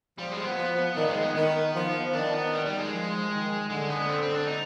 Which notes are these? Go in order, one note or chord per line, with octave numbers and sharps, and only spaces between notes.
F3 G3
G#3
B3
F3
D#3 D4
B3
G#3
B3
D#3 B3
F3
D#3 D4
B3
G3
G3
G#3
F3
D#3
D3 G#3
B3
C4
C4
D4
D#4